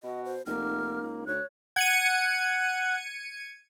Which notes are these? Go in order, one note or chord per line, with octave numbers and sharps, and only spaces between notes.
B2 F#4 D#5
C5
F1 A#3 D#4 F6
C#2
D2 C#5 F#6
F#5 G#6 C#7 D#7